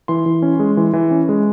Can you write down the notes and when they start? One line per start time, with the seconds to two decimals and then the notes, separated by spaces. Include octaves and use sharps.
0.08 E3 C6
0.26 E3
0.42 C#4
0.59 G#3
0.77 E3
0.93 E3
1.11 C#4
1.29 G#3